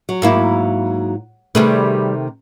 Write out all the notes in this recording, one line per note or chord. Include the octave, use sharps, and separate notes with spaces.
F#3
G#2 A#3 E4
C3 D#3 G3 A3 G#4 B4